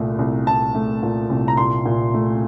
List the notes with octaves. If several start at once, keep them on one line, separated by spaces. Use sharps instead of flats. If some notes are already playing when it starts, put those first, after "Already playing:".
Already playing: C2 A#2 A3
C2
C2 A5
A3
A#2
C2
A#5
A#2 C6
A#2
A3